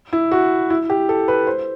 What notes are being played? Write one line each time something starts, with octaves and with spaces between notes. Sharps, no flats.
E4
F#4
E4
G4
A4
B4
C5